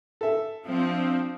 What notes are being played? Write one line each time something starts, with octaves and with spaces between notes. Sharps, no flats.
A4 E5
F3 C4 D4